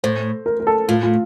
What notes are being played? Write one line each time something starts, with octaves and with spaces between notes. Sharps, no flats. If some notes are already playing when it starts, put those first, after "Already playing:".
A2 C5
A#4
A#4
A4
A2 F4
F4